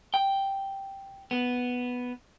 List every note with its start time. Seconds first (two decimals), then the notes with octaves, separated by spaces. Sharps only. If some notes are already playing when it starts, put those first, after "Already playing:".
0.14 G5
1.31 B3